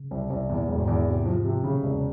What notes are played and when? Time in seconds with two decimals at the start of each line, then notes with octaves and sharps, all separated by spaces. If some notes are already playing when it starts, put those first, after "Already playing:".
Already playing: C#3
0.11 C2
0.30 C2
0.49 E2 A#2
0.68 E1
0.78 G#2
0.87 E2
1.06 C3
1.25 F3
1.45 C3
1.64 A#2 C#3
1.83 E1 C3
1.96 C3